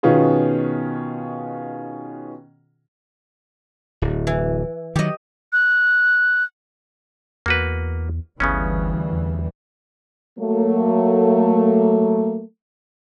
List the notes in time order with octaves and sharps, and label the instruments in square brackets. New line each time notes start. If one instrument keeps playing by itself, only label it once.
[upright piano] B2 D#3 B3 C#4 F4 G#4
[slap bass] D1
[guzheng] E3
[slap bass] D#3 F#3 [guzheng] G4 D#5
[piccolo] F#6
[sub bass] E2 [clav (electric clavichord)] A#3 F#4 B4
[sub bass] G1 [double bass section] D2 E3 G3 [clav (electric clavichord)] C#3 B3 C#4
[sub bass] E2
[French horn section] F#3 A3 A#3